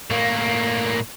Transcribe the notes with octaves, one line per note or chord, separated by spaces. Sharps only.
A2 A#3